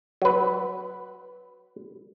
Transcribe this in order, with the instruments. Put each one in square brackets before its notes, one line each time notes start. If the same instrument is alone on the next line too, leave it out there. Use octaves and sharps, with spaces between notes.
[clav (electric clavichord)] F#3 B4